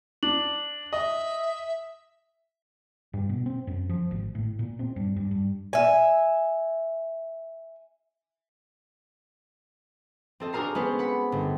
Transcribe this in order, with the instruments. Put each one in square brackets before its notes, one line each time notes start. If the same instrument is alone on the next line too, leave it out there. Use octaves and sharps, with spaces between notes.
[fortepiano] D4 [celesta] F#7
[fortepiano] D#5 [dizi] E5
[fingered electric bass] G2
B2
C4
F#2
F3
G#1
A2
A#2
C4
G2
G2
G2
[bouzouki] E5 G#5
[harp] C4 A4 D#5
D4 F#4 G#4 A#4 A#5 C7
G#3 B3 C#4 F#4 B4 C5
F#5 B5
G1